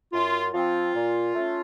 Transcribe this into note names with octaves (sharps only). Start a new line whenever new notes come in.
F#2 F4
F3 C4 F4
A#2
A3 C#4